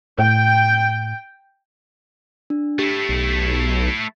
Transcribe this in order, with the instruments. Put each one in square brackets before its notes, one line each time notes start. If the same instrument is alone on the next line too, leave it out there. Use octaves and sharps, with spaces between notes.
[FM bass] A2 [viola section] G5
[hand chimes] D4
[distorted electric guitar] A3 E4 [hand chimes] G4
[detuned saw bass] B1